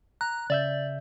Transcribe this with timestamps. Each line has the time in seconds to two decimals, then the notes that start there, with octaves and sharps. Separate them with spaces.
0.21 A#5 F#6
0.50 C#3 D5 E5 G6